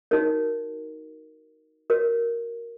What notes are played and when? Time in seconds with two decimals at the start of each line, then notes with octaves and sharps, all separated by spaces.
0.11 D#4 F#4 A#4 C#5
1.90 F#4 A#4 C#5